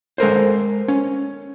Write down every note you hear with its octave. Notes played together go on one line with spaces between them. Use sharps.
G#3 A4 A#4 C5
C#4